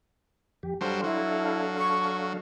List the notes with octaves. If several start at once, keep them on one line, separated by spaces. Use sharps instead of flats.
F2 G4
F#3 G3 D4 A4 C5 F5
F#3 E4
C#6